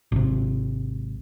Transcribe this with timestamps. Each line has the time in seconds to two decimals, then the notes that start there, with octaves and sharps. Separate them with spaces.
0.12 G#1 C3